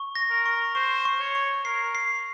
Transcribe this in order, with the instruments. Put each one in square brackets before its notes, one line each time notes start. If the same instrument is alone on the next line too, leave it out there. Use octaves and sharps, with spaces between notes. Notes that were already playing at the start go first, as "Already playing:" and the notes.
Already playing: [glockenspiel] C#6
A#6
[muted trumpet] A#4
[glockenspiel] C#6
[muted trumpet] C5 [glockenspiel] C#6
[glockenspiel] C#6
[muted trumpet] C#5
[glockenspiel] C#6
[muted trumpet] A#4 [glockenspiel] C7
[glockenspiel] C7